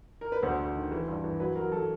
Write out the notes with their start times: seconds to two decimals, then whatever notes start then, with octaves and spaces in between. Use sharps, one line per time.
0.21 A#4
0.32 B4
0.43 D2 C5
0.59 D2
0.75 D#3
0.92 E3
1.08 G2
1.24 E3
1.40 F#3 B4
1.56 F#3 A#4
1.72 F#3 A4